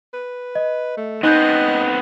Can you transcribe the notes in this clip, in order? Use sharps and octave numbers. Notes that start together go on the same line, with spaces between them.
B4
D#5
A3
B3 C4 D#4 D#5 F#6 G6